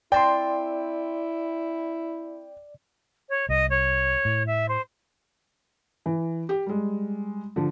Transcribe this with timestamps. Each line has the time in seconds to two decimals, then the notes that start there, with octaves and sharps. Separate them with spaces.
0.12 C4 E4 D5 G5 A5 C6
3.29 C#5
3.49 C2 D#5
3.70 C#5
4.25 A2
4.47 E5
4.69 C5
6.06 E3
6.49 G4
6.66 G3 G#3
7.56 D3 F3